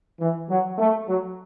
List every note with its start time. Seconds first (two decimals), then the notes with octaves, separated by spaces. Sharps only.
0.20 E3
0.50 F#3
0.78 A3
1.07 F#3